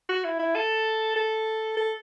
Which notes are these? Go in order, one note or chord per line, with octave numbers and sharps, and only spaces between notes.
F#4
E4
E4
A4
A4
A4